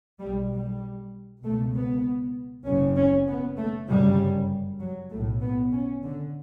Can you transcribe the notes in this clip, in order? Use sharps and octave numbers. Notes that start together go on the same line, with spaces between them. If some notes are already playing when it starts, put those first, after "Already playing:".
B1 B2 G3
G3
C#2 B2 A3
B3
F#1 F#2 C#3 C#4
C#4
B3
A3
G1 F#2 C#3 G3
F#3
B1 A2 A3
B3
C#4
D3